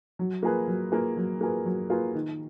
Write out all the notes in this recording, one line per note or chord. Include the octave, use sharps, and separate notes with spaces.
F#3
A#3 F4 G#4 B4
F#3
A#3 F4 G#4 B4
F#3
A#3 F4 G#4 B4
F#3
A#3 F4 G#4 B4
D#3